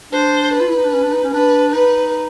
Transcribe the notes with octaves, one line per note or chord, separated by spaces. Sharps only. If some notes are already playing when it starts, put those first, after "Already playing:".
D4 C5
B4
F4
E4
D#4
D4
C#4
D4
D#4
C#4
D4 B4
D#4 B4